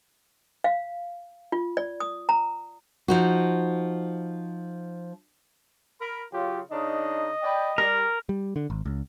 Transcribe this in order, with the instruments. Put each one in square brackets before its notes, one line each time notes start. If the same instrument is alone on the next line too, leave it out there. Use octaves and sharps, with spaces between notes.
[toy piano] F5
F4
D5
D#6
A#5
[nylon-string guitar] F3 D#4 F#4
[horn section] A#4 B5
[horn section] C#3 F#3 F4 [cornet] G4
[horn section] C#3 D4 D#4 [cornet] D#5
[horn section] B4 D5 G5
[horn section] G3 [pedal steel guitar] A#4
[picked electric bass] G3
D3
G#1
C#2